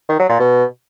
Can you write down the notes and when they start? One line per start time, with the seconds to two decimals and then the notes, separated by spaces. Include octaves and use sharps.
0.09 D#3
0.19 F#3
0.29 A#2
0.39 B2